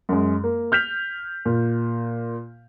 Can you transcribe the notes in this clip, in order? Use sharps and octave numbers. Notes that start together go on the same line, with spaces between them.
F#2 G#3
A#3
F6 G6 B6 F7
A#2